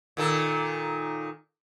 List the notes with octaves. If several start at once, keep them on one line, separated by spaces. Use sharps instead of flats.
A#2 D#3 A4